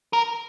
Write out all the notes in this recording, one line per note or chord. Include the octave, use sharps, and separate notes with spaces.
A#4